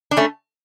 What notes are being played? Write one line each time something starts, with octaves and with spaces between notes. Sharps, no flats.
D4
A3 C#4